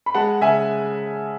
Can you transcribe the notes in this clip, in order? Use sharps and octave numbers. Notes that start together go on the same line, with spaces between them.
B5
G#3 F#5 A5
C#3 E5 G#5